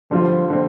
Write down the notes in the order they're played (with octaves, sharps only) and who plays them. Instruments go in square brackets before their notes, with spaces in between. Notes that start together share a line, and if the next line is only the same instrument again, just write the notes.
[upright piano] D3 G3 C4 F4 [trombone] F3
[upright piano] D3 G3 C4